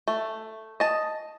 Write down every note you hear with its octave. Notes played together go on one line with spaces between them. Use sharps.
A3
D#5 A5